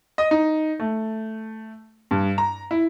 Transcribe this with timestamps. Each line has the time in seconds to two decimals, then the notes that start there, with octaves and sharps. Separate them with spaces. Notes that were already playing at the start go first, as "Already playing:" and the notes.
0.18 D#5
0.31 D#4
0.80 A3
2.11 G2
2.38 A#5
2.71 E4